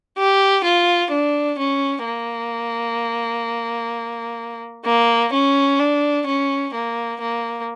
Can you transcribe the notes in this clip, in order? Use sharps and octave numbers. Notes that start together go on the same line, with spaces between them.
G4
F4
D4
C#4
A#3
A#3
C#4
D4
C#4
A#3
A#3